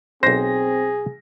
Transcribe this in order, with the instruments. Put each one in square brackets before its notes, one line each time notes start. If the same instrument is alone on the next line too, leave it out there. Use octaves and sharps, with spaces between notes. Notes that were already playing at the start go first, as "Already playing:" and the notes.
[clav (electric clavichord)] B1 C5 [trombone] C4 [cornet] G#4 [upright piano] A#6